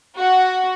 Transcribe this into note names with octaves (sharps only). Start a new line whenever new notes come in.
F#4